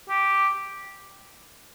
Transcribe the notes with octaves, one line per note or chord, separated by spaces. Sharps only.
G4